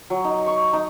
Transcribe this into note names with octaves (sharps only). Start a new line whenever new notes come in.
F#3
D#4
C#6
D#4